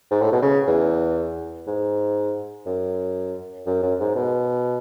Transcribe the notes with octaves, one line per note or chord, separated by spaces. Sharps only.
G#2
A2
B2
C#3
E2
G#2
F#2
F#2
F#2
G#2
B2